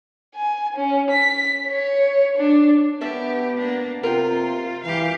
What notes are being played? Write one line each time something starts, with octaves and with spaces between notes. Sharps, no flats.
G#5
C#4
B6
C#5
D4
B3 G4 C#5 E5 A5
A#3 D4
C3 F4 A#4 G5
E3 G4 F5